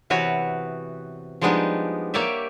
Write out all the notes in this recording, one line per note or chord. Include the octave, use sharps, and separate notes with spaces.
C3 E3 B3 F#4 B4 C#5
F3 G3 G#3 B3 D4 D#4
A#3 G4 C#5 D5 E5